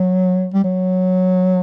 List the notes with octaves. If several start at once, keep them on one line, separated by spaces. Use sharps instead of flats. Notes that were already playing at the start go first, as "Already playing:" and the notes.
Already playing: F#3
G3
F#3